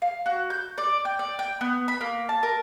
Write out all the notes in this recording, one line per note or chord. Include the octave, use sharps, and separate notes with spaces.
F5
F#4
G6
D5
G5
D5
G5
B3
B5
A#3
A5
A#4